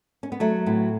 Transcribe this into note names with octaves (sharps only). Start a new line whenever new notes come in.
C#4
B3
F#3 A3
A2 B3